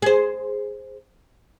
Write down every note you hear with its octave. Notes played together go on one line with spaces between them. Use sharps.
G#4 C5